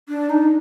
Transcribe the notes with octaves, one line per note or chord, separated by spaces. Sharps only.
D4
D#4